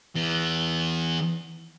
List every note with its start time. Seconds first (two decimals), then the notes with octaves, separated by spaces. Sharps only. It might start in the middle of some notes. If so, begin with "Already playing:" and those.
0.15 E3 B3